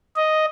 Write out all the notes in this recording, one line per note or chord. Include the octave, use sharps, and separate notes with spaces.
D#5